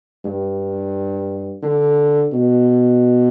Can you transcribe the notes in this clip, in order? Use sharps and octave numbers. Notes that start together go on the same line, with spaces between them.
G2
D3
B2